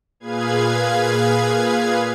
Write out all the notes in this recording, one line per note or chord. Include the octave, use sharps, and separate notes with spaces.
A#2 G#4 B4 F5 G#6